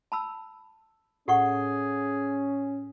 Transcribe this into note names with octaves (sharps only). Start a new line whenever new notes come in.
A5 B5 E6
A2 C#4 G4 G#4 F#5 C#6